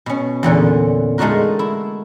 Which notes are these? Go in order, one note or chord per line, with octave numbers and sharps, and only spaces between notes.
B2 C#4
E2 A#2 D3 C#4
G#3 A3 D#4 F4 F#4 A#4
E4